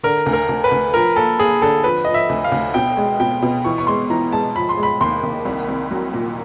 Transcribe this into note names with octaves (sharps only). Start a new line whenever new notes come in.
D3 A#4
D2
A#4
D2
B4
D2
F3 A#4
A#3 A4
A#3 G#4
D3 A4
F3 B4
F3 D#5
E5
D2
F5
D2
B2 G5
G#3
B2 G5
B2
E3 C#6
C#6
G#3 C6
E3 A#5
G#3 A5
F3 B5
C6
G#3
B5
D#2 C6
D#2
C2
C2
F#3
A#2